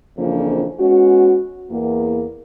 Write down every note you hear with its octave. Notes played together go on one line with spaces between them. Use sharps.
F2 C#3 E3 F3 A#3 D4
G#3 B3 C#4 F#4
E2 A#3